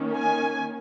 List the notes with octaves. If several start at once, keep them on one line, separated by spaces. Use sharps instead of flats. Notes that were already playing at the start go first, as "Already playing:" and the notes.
Already playing: D#3 A#3 C#4
G#5